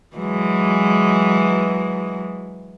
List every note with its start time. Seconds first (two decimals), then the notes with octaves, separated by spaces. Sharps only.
0.17 E3 F#3 G#3